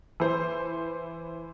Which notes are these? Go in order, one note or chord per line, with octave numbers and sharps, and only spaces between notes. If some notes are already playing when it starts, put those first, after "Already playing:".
E3 C5